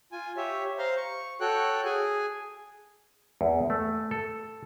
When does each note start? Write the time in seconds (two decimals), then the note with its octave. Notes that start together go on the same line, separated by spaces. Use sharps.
0.12 F4 G#5
0.37 G4 C#5 E5
0.79 C5 F5 A#5 C6
0.97 C#6
1.41 F#4 A4 C#5 G5 F#6
1.85 G#4 G#5
3.41 E2
3.70 A3
4.11 A4